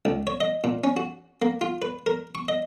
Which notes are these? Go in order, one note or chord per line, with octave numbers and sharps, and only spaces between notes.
C#2
C#5
D#5
A#2
C#4
F#4
A#3
F4
B4
A#4
C#6
D#5